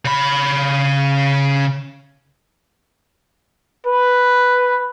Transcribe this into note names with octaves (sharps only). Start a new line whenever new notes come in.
C#3 B5
B4